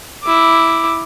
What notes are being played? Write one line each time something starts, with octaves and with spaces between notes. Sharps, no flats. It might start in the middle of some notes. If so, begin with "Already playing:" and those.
E4 D6